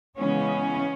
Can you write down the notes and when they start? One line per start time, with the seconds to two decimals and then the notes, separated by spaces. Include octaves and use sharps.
0.18 C#3 E3 G#3 B3 C#4